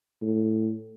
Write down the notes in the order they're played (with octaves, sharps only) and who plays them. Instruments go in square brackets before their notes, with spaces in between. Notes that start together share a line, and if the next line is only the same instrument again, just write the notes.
[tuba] A2